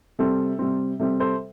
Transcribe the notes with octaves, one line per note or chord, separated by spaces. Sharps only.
C3 G3 C4 A4
C3 G3 C4
C3 G3 C4 A4
A4 C5